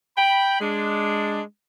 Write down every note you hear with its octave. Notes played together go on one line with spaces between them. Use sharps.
G5 B5
G#3 D4